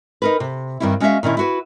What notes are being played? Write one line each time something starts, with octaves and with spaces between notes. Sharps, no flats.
D#4 A#4 B4
C3
G2 D#3 G3 C4 E4
G#3 C#4 F#4 A#4 E5 F5
A#2 D#3 C#4 E4
E4 F#4 B4